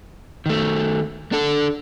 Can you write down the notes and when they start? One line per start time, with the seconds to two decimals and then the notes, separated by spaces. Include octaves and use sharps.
0.46 D#3 A3
1.32 D4 A4